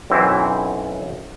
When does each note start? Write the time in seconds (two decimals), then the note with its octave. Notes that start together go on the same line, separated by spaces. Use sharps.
0.10 B1 F#2 E3 C4 E4 E5